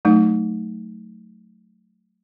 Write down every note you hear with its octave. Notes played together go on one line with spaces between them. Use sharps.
F#3 A3 D#4